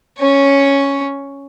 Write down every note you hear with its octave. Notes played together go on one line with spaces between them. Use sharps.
C#4 C#5